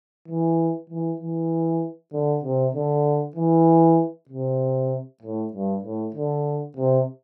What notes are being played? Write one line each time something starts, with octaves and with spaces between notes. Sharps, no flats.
E3
E3
E3
D3
C3
D3
E3
C3
A2
G2
A2
D3
C3